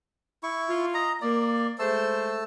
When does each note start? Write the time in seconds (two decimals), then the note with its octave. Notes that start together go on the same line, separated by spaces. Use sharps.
0.43 E4 C#6
0.68 F4
0.94 D#5 A#5
1.22 A#3 D5
1.79 G#3 A3 C5 A5 E6